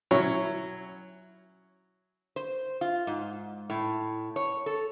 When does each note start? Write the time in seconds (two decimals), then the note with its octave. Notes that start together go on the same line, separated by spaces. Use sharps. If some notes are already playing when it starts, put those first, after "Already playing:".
0.11 F#3 C#4 E4 C#5
2.36 C5
2.81 F4
3.07 G#2
3.70 A2
4.36 C#5
4.66 A4